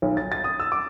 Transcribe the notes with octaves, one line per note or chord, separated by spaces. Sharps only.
B1
A6
A6
D#6
E6
D6